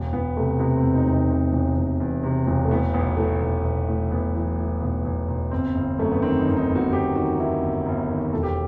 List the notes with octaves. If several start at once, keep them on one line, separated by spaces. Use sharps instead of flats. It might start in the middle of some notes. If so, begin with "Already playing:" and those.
Already playing: E1
E1 B3
C3 A3
C3 B3
C4
E1
D#4
E1
D#4
C3
E1
E1
E2
C3
E1
A3
A2 B3
B1 B3
A2 A3
B1
B1
A2
B1 B3
E3
A2
B1 B3
B1
B1
G1 C4
G1
F#2 A3
B3
D#3 C4
D#4
G1 C4
D#4
G1
F#4
G1 G4
D#3 F#4
D#3 E4
G1
G1
D#3
E1 A4
G4